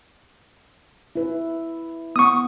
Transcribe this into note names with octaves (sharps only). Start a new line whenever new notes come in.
E4 B4
B3 F#5 C#6 D#6